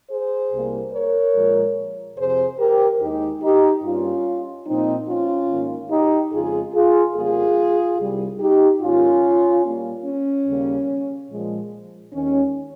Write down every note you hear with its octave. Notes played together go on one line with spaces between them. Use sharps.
G#4 C5
C2 C3 G3 A#3
A#4 C#5
A#2 F3 G#3
F2 C3 F3 G#4 C5
G4 A#4
D#2 D#3 G#3 D#4 G4
D#4 G4
G2 G3 A#3 C#4 F4
A#2 F3 A#3 C4 D#4
C#4 F4
G#2 D#3 A#3
D#4 G4
F2 C#3 G#3 F4 G#4
F4 G#4
F2 C#3 G3 A#3 F4 G#4
C2 C3 G3
D#4 G4
G#2 D#3 A#3 C#4 F4
A#2 G3 A#3
C#4
D#2 C#3 G3 A#3
A#2 F3 G#3
D#2 D#3 G#3 C#4